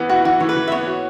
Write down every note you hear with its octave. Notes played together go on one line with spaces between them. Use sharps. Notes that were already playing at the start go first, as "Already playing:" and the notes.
Already playing: E3 B3
E4 F#4
E3 F#4
E3 C#5
B4
E3
E5
B3 C#5
F#4